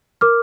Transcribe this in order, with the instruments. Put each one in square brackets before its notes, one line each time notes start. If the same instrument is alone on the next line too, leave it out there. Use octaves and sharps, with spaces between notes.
[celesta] A#4 D6 F6